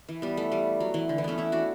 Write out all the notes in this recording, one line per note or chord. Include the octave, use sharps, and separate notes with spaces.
E3
G3 B3
A3
G3
F#3
E3
D3
E3
A3 B3 C#4
C#4 E4
D4 F#4